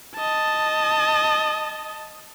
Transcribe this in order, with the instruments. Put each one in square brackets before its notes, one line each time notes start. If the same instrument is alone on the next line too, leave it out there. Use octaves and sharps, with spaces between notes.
[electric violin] D#5 A5